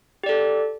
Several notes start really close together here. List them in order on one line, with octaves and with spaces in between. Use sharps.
G4 D5 A4